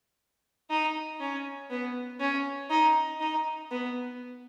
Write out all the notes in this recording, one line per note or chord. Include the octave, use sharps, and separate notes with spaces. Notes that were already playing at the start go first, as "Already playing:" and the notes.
D#4
C#4
B3
C#4
D#4
D#4
B3